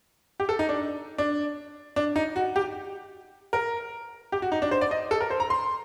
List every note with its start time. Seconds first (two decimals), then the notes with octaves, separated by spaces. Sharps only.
0.40 G4
0.49 A4
0.59 D#4
0.69 D4
1.18 D4
1.96 D4
2.16 D#4
2.36 F#4
2.56 G4
3.53 A#4
4.32 G4
4.42 F#4
4.52 D#4
4.62 D4
4.71 C5
4.81 D5
4.91 D#5
5.11 A4
5.21 A#4
5.30 C5
5.40 A#5
5.50 C6